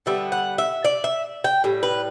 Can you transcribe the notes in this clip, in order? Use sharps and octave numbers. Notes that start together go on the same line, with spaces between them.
D3 G3 B3 E5
F#5
E5
D5
E5
G5
A2 G3
B4